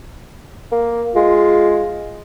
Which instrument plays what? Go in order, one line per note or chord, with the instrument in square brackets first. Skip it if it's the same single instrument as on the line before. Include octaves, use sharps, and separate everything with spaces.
[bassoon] A#3
[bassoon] G#3 [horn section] F4